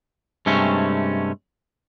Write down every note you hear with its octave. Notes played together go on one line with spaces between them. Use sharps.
G2 C3 G#3 A3 C#4